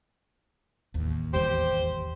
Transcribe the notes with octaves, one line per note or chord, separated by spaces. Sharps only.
A1 D#2
E1 E2 G3 G4 C5